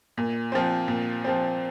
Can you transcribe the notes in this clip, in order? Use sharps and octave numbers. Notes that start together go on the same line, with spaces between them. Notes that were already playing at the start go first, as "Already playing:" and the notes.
A#2
F3 C4
A#2
F3 C4